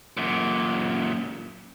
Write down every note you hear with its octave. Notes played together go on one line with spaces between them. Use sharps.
F#2 A#2